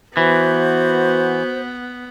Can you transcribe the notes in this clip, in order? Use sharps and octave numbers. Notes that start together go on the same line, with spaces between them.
E3 B3 F#4 C5